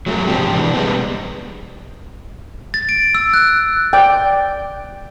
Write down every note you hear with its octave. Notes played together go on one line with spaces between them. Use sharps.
F#3 G#3 A3 G4 A#4
G#2 C3 F3 C4 D4 G4
B2 E3 D4
G3 G#3 B3 C4
A6
D7
E6
F#6
D5 G5